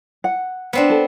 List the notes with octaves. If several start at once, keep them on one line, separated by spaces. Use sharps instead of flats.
F#5
B3 C4 D4
A4